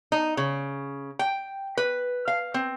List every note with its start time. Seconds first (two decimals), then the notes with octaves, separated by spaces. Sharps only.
0.12 D#4
0.37 C#3
1.19 G5
1.77 B4
2.28 F5
2.54 C4